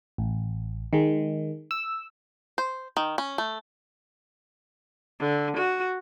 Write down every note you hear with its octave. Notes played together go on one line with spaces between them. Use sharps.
A1
D#3 G#3
E6
C5
D#3
C#4
A3
D3
F#4